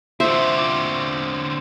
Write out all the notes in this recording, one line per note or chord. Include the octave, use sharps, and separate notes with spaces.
D3 C4 F4 C5 E5 C7
F4 D6